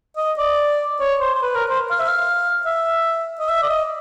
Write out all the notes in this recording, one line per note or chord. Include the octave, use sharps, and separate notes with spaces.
D#5
D5
C#5
C5
C5
B4
A#4
C5
F5
E5
F5
E5
D#5
E5
D5
D#5